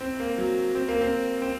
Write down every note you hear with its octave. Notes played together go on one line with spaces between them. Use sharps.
C4
A#3
F#3
C4
A#3
C4
C4